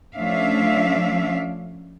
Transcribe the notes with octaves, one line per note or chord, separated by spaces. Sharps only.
F3 A3 C#4 D4 E5 F5